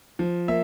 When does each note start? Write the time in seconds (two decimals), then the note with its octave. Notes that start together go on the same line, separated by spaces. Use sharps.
0.19 F3
0.48 A#3 E5